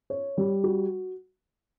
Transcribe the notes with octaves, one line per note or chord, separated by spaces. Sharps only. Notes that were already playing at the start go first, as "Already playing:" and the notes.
C#5
G3
F#4